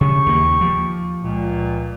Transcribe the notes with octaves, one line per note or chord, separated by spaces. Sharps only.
C#3 G4 C#6
D#2 A#3
F3
C#2 A#2